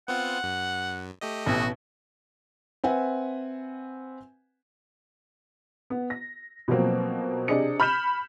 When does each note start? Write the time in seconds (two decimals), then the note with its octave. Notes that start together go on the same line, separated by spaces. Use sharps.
0.08 B3 C4 F4 F#5
0.43 F#2
1.21 A3 G4 D#5
1.46 A1 B2 F#4
2.84 C4 B4 E5 F#5 G#5
5.90 B3
6.10 A#6
6.68 B2 F3 F#3 A#3 C4
7.48 C3 D4 G#4 D#5 C#7
7.80 B5 F6 G6 B6 E7